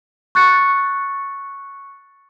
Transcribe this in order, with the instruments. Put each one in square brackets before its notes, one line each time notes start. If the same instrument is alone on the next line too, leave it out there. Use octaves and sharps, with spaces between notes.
[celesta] C#6 F#6 A6 C#7